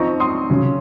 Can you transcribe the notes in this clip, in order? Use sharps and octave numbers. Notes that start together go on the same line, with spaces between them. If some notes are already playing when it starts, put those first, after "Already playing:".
Already playing: F3 C4 D#4 A#5 C#6
C6 D#6
C#3 F#3 C#4